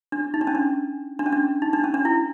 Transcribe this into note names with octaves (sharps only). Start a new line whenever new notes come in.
D4
D#4
D4
C#4
D4
D4
C#4
D4
D#4
D4
C#4
D4
E4